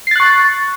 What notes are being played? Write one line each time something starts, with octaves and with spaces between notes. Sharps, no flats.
C#6 F#6 A6 C7